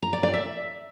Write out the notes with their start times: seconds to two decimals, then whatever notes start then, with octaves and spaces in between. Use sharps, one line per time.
0.02 A#5
0.13 D5
0.23 D5
0.34 E5